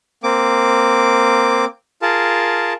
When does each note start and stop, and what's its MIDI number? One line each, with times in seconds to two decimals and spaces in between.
0.23 1.65 58
0.23 1.65 60
0.23 1.65 86
2.02 2.73 65
2.02 2.73 68
2.02 2.73 70
2.02 2.73 81